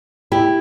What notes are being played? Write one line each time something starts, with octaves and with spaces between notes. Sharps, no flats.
E4 G4